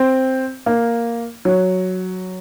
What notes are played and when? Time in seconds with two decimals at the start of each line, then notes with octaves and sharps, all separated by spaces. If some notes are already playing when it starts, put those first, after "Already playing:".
Already playing: C4
0.66 A#3
1.45 F#3